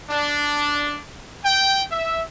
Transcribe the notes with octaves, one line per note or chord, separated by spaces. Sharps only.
D4
G5
E5